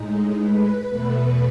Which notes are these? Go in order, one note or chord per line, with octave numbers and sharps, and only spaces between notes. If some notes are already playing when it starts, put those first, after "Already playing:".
Already playing: A2 G#3 D#4
B4
E2 B2 A3